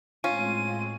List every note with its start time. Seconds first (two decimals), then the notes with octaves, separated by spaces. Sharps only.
0.24 A2 G#3 C4 C#4 F4 D#7